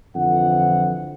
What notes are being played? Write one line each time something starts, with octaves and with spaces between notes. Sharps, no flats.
F2 D3 E3 F3 F#5